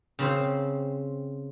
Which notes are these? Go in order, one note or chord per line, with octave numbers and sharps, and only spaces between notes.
C#3 C4 C5